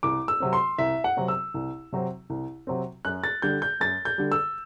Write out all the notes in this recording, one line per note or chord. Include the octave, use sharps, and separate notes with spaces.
C2 D6
E6
C3 F#3 C4
C6
C2 E5
F#5
C3 F#3 C4
E6
C2
C3 F#3 C4
C2
C3 F#3 C4
F#2 F#6
A6
D3 G3 G6
G6
F#2 A6
G6
D3 G3
E6